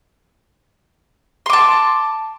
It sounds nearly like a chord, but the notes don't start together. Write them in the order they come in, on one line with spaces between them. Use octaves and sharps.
C6 D6 A5